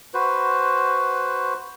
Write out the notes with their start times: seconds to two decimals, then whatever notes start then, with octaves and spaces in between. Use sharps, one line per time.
0.14 F#4 B4 C5